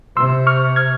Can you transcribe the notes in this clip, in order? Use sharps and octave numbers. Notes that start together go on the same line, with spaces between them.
C3 C6 E6
C#6 F6
F6 G#6